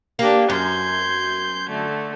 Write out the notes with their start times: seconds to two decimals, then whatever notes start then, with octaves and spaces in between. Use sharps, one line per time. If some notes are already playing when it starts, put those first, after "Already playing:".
0.19 A#3 D4 G4
0.50 F#2 C6 G6 G#6
1.68 D3 A3